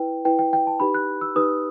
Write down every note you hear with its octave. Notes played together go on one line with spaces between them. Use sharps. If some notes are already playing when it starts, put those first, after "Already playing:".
Already playing: E4 B4 G5
E4 B4 G5
G5
G5
A5
D#4 G4 B4 B5
F#6
E6
D#4 G4 B4 D#6